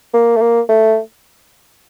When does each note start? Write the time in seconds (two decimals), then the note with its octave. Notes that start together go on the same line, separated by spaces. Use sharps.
0.14 A#3
0.37 A3
0.42 A#3
0.69 A3